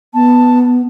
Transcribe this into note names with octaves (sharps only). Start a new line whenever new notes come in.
B3 A5